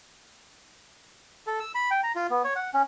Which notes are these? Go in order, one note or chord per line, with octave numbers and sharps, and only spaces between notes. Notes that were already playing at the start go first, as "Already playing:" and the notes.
A4
E6
B5
G5
A#5
F4
B3
C#5
F#5
C#4